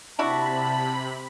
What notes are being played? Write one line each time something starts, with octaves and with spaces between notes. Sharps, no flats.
C3 D4 E4 F#4 A5 B5